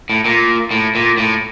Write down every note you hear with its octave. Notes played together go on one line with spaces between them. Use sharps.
A2
A#2
A2
A#2
A2